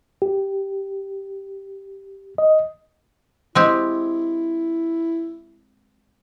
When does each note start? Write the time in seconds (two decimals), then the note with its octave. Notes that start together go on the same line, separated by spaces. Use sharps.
0.22 G4
2.38 D#5
3.55 G#3 C4 E4 G4